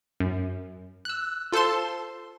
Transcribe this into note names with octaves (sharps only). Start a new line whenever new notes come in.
F#2
E6 F#6
F4 A4 C5 A5 C6